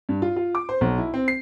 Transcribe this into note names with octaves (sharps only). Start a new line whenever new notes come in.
G2
F4
F4
D6
C5
B1
E4
C4
C7